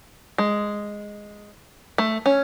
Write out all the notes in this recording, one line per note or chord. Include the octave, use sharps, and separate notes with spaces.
G#3
A3
C#4